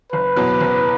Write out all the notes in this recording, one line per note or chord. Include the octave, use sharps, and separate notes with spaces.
F#1 B4
E2 B2 F#3
F#1